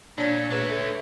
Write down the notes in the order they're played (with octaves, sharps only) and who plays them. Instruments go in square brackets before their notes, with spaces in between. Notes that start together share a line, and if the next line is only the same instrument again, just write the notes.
[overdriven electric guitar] A#2 [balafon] D4 D5 A5 [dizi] C#5
[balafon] A3 G#4 B4 [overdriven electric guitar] D4 E5
[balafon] A4